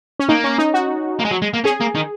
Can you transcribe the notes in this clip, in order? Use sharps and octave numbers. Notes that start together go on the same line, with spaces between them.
C#4
A#3 D#4
C#4
D#4
F#4
A#3
G#3
F#3
G#3
A#3
C#4 G#4
A#3
D#3